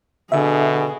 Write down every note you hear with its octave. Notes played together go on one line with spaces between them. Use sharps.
B2 D3 G#4 E5